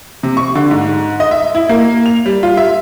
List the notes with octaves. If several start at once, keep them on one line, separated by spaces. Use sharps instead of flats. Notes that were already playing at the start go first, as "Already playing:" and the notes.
C3
C#6
D3
G#2
D#5
E5
E4
A#3
F7
G3
F4
E5